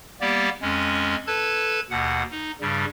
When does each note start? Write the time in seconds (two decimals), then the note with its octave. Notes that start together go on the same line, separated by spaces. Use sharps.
0.21 G3 A#3 B3 G4 D5
0.62 F2 G#3 C#4
1.27 A4 B4 A5 G#6
1.90 D#2 B2 F#5
2.31 D#4
2.61 G2 C#3 G3